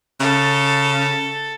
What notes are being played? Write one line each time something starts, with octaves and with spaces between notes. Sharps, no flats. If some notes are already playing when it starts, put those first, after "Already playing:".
C#3 A4